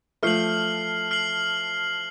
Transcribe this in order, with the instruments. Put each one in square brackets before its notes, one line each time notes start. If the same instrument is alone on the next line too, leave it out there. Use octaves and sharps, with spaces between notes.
[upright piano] F3 A3 [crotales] F6 C7 F#7
[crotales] F6 C7 F#7